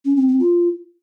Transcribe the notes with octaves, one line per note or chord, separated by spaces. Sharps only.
C#4
C4
C4
F4